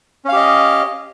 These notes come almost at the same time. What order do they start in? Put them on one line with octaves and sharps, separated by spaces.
C#4 F5 G4 D#5